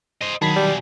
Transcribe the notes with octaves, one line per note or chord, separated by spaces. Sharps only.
C5 D#5
B2 D#3 F#3 G#4 A5 B5 B6
G3